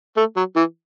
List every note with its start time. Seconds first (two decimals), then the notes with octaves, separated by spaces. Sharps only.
0.17 A3
0.36 F#3
0.56 E3